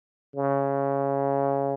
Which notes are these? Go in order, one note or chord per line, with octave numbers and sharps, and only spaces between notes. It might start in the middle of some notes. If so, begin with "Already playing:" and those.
C#3